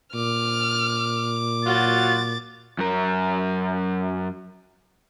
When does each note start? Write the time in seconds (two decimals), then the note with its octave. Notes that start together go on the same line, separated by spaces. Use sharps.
0.14 A#2 D6 F6
1.65 F#3 F4 F#4 A6
2.79 F#2 A#4